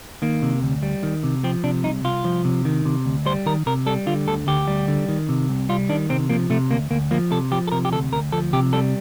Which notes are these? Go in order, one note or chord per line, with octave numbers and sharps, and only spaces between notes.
D#3 A#3
C3
D2
G3
D#3
C3
F3 C4
C3 D4
C2 D#4
C2 F4
F3
C3
D#3
C3
D2
G3 C5
D#3 A#4
C3 A#4
G3 A4
D3 F4
D2 A4
D2 G4
G3
D3
D#3
C3
C2
G3 F4
D#3 D4
C3 C4
F3 A#3
C3 A3
D2 A#3
D2 A#3
F3 A#3
C3 A4
F3 G4
A4
C3 A#4
G4
D2 A4
D2 A#4
F3 A4
C3 G4
G3 A4